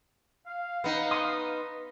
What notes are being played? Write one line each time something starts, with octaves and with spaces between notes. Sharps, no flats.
F5
B3 D#4
C6 D#6